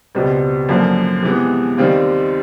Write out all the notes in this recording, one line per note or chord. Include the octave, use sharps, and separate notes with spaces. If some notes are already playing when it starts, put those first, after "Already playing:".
C#2 B2 G3 C4
F#2 D3 F3 A#3
C3 E3 G#3 B3
D#2 D#3 G3 C4 F4